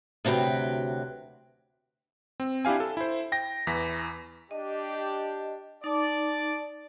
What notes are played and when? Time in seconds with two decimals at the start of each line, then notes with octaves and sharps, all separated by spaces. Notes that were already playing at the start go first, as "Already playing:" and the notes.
0.25 D2 C3 F#3 B4 G5
2.40 C4
2.65 D4 E4 G4 F5 G#5
2.80 A4
2.97 E4 C5
3.32 G5 A#6
3.67 E2 E3 A#6 B6
4.51 D4 G4 D#5
5.84 D#4 D5 A5